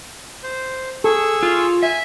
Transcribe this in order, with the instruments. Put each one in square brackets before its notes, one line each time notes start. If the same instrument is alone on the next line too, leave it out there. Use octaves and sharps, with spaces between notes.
[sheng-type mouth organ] C5
[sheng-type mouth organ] G#4 C#6 E6 [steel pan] A4
[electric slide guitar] F4
[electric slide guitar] E5 [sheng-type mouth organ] G#5